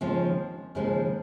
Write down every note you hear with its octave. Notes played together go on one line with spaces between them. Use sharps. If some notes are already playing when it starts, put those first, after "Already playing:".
D#2 C#3 F3 G#3 C4
D#2 C#3 F3 G#3 C4